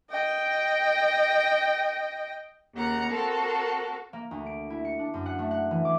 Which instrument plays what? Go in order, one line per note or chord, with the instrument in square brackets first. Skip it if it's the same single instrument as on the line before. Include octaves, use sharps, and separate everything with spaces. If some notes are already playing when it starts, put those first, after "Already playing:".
[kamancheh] D#5 G5
[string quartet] D#2 C#3 F#5 A#5
C4 F#4 A4 A#4
[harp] A#3
D2
D7
E4
C#7
D4
F#2
F#5
A3
F#5
E3
D6